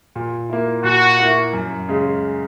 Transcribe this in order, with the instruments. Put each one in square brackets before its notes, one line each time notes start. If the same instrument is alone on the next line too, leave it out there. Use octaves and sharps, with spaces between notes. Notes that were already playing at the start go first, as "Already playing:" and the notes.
[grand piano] A#2
A#3 E4
[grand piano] A#2 [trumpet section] F#4
[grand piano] A#3 E4
F#2
C#3 G#3